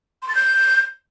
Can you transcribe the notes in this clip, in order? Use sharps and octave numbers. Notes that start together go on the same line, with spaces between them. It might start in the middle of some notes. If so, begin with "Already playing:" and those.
C6
A6
G6